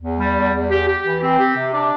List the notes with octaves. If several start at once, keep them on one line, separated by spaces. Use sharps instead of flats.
E2
G3
E2
E2
G4
G4
E3
C4
G4
C3
D4